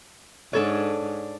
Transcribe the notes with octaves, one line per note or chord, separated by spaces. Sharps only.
G#2 D4 A4 C#5